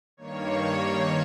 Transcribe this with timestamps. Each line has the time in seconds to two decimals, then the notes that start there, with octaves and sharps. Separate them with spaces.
0.17 G2 D#3 A#3 C#5